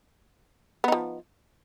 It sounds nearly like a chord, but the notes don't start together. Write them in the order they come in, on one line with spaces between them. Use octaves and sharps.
B3 D#4 F3